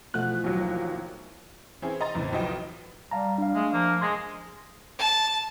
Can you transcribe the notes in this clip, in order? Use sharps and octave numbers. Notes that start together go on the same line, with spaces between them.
B2 E3 F3 A3 F#6
D#2 F#3
E3 C4 C#4 E4 G#4
D#5 A#5 C6 A6
E2 A2 C#3 C4
B1 E3 F3 D#5 G5
G3 F5 A5 A#5
D4 F5
G#3 A3
F3 A#3
G#3 C6 G#6 A#6
A5